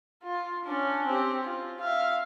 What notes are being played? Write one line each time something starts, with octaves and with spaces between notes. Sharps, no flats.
F4
C#4 D4
C4 G4
F4
E5 F5